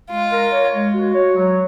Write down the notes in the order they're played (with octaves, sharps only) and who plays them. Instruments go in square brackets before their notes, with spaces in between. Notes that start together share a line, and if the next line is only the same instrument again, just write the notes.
[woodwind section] G#3 [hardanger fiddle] F4
[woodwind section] A#4
C#5
G#3
F#4
C#5
F#3